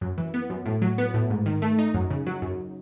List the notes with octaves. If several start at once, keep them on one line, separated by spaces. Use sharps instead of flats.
F#2
E3
B3
F#2
A2
F#3
B3
A2
G#2
D#3
A3
D#4
F#2
C#3
F#3
F#2